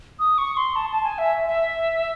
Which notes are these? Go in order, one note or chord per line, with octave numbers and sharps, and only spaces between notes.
D#6
C#6
C6
A5
A5
G#5
E5
E5